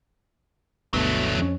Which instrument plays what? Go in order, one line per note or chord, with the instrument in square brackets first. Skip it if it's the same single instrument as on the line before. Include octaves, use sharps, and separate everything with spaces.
[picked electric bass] G1 D2 B2 [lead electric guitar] F#3 A3
[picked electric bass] F2 C#4